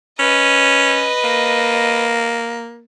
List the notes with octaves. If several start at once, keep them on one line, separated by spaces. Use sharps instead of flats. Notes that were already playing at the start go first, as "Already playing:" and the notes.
C#4 B4 D#5
A#3